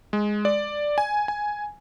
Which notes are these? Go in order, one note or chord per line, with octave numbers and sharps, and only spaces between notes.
G#3
D5
G#5
G#5